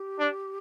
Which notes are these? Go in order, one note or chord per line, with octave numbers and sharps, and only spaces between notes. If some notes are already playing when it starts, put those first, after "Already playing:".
Already playing: G4
D4